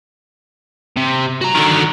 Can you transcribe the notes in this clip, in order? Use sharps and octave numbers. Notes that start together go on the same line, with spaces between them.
C3
F#4 A#5
D3 D#3